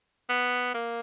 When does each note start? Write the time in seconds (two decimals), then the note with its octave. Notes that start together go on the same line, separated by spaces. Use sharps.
0.29 B3
0.74 A#3